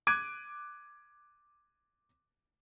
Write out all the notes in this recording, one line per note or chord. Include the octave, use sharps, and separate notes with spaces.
D6 F#6 G#6 D7 D#7